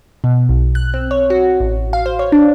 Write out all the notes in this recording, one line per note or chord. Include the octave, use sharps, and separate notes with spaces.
B2
B1
F#6
C4
C#5
F#4
A1
F5
C5
C#5
D4